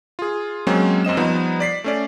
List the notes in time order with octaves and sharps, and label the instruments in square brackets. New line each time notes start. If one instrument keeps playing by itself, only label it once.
[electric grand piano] F4 G#4
F#3 G#3 A#3 C4 C#4
F#2 C4 D#5 E7
F3 G3 B3 D#4
D5 B6 C7
A3 C#4 D5